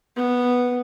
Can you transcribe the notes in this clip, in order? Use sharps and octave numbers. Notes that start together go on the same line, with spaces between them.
B3